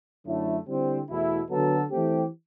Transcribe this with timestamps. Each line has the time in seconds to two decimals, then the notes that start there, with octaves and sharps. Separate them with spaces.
0.24 F#2 D3 F#3 A3 E4
0.66 D3 G3 C4 E4
1.08 E2 B2 A3 E4
1.50 D3 F#3 B3 F#4 A4
1.91 E3 A3 C4 G4